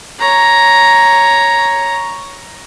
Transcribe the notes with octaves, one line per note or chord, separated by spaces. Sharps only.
C#5 A#5